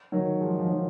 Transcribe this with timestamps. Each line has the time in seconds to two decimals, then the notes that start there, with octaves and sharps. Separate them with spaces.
0.12 D#3 F#3
0.40 F3 G#3
0.59 F3
0.68 D#3 F#3